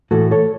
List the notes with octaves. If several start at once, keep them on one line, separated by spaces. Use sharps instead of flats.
A2 E3 F#4 A4
A4 C#5